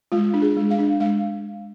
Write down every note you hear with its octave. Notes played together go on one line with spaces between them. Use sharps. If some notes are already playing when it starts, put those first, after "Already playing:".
G#3 F4
D4
G#4
G#3
F5
D4
G#3 F5